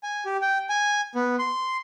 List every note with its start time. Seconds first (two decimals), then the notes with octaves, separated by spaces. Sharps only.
0.03 G#5
0.25 G4
0.41 G5
0.69 G#5
1.15 B3
1.39 C6